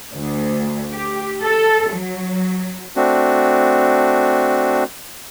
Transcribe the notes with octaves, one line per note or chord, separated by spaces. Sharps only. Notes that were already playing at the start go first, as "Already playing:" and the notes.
D2
G4
A4
F#3
A3 C4 D4 F#4